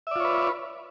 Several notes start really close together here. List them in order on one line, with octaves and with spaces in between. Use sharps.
E5 D5 F4 C#5 B4